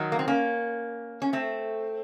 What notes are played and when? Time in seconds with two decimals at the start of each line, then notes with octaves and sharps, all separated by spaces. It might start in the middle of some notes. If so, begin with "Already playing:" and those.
Already playing: D#3 F#3
0.12 A#3
0.19 C4
0.28 A#3 C#4
1.22 C#4
1.33 A3 C4